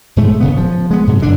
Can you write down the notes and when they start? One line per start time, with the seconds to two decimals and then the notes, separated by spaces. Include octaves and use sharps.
0.16 G#2 B2 G#3 A3
0.41 D1 C#3 B3
0.57 F3
0.91 G#3 B3
1.07 G#2 C3 F#3
1.22 G1 F#2 D3 D4